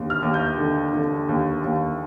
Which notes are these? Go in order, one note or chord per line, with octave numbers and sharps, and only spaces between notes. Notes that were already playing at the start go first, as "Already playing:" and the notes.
Already playing: D#2 D3
F6
D#2
G6
D3
D3
D#2
D#2